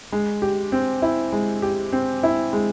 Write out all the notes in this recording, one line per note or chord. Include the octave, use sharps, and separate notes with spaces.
G#3
G4
C4
E4
G#3
G4
C4
E4
G#3